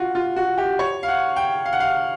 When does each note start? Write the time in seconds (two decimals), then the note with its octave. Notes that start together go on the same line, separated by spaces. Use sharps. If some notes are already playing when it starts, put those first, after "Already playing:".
Already playing: F4 F#4
0.15 F4
0.36 F#4
0.58 G4
0.79 C#5
1.03 F5
1.08 F#5
1.36 G5
1.65 F5
1.73 F#5
1.80 F5